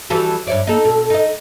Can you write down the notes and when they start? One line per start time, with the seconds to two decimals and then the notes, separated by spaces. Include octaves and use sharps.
0.10 E3 G3 F#4 A4
0.47 G2 C#5 D5 E5
0.67 A#3 D#4 A4
0.85 B2 A4
1.10 D#4 D#5